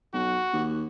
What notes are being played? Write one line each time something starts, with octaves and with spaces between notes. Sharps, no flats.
B1 F#4
D#2